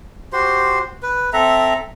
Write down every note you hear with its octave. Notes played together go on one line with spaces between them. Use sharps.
F#4 G4 C5 C6
B4
C4 A4 E5 A#5